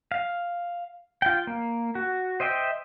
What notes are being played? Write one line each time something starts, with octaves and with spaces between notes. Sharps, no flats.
F5
F4 G5
A#3
F#4
C5 D#5 E5 G5